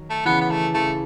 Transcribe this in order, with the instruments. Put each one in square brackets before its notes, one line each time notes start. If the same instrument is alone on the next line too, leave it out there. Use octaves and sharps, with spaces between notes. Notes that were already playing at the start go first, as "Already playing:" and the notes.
Already playing: [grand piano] D#3 F#3
[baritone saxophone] A3
[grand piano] C#3 E3 [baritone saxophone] B3
[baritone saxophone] B3
A3
[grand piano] C#3 E3 [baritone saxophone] A3